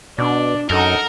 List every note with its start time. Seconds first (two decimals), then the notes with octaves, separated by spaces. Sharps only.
0.18 B2 D4 D5
0.70 F#2 D#4 A4 A#4 F#5